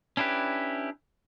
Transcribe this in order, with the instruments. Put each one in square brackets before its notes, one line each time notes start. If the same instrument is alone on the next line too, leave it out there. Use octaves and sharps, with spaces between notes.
[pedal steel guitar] C#4 D4 E4 G4 B4